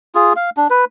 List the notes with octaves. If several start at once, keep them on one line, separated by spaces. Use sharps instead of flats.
F4 G#4
F5
D4
B4